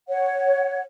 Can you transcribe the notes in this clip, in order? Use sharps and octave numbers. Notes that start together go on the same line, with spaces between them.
C#5 F#5